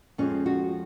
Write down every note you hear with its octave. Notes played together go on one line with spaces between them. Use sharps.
F2 F3 G#3 C#4
F#4